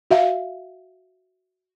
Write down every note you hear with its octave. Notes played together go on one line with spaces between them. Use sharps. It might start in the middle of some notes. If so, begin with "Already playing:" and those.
F#4 E5 F5